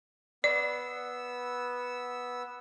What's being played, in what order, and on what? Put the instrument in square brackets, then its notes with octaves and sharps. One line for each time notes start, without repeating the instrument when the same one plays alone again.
[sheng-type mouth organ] B3 E6 [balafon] D5